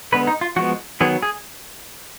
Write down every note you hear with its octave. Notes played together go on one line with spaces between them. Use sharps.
D3 G#3 B3 B4
D#4
F4
F3 G#3 B3 F#4
D#3 F#3 B3 G#4
G#4